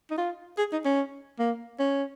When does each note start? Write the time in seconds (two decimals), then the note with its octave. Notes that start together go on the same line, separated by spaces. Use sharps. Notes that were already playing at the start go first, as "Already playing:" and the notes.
0.11 D#4
0.18 F4
0.58 G#4
0.72 D#4
0.85 C#4
1.39 A#3
1.79 C#4